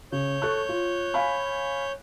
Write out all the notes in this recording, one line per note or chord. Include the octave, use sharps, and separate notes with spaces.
C#3 C#5 G6
A4 C#6 F#6
F4
F5 G#5 B5